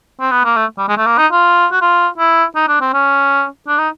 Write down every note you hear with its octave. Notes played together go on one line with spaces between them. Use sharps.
C4
B3
A#3
A3
G3
G#3
A3
A#3
D#4
F4
F#4
F4
E4
D#4
D4
C4
C#4
D4
D#4